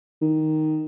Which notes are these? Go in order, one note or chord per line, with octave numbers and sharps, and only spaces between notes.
D#3